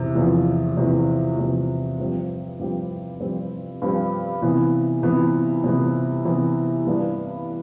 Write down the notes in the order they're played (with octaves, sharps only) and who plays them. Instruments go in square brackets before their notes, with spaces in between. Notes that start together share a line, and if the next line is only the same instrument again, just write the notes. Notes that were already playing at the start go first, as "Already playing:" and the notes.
Already playing: [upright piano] E2 C3
E2 C3 F3
E2 C3 F3
E2 C3 F3
G2 F3 C4 G4
G2 F3 C4 G4
G2 F3 C4 G4
G2 F3 C4 G4
C3 E3 B3
C3 E3 B3
C3 E3 B3
C3 E3 B3
A1 G2 E3 B3 D4